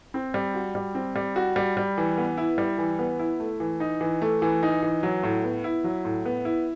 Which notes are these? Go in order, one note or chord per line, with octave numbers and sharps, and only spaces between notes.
C4
G3
F#4
G3
C4
G3
F#4
G3
G3
E3
B3
E4
G3
E3
B3
E4
A3
E3
D#4
E3
A3
E3
D#4
E3
F#3
A2
B3
E4
F#3
A2
B3
E4